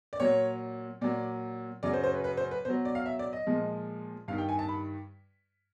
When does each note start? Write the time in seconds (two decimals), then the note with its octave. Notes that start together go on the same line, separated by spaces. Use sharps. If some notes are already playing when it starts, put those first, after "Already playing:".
0.13 D5
0.20 A#2 F#3 C#5
1.01 A#2 F#3 D5
1.83 F#2 C#3 F#3 D5
1.93 C5
2.04 C5
2.14 B4
2.24 B4
2.37 C5
2.51 B4
2.65 B2 C5
2.70 F#3
2.85 D5
2.95 F5
3.06 E5
3.19 D5
3.33 D#5
3.47 A#2 F3 G#3
4.28 G2 D#3 G3 F5
4.38 G5
4.49 G#5
4.59 A5
4.69 B5